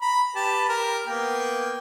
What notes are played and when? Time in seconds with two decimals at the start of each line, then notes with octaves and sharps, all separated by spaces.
0.01 A#5 B5
0.36 G4 B4 A5
0.69 G4 A#4
1.07 A#3 B3 G5